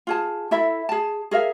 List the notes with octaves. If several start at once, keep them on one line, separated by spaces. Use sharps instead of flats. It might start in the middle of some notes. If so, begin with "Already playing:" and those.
F4 G#4 A5
E4 A4 E5 B5
G#4 A5
G#4 A#4 E5 F5